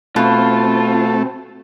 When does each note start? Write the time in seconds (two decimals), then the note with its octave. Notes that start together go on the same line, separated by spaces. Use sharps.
0.16 B2 A3 C4 F4